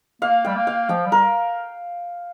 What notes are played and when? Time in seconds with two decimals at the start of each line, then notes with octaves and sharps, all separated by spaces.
0.22 A#3 F5
0.45 G3 G5
0.56 A#3
0.67 F5
0.89 F3 G5
1.06 G3
1.12 A#4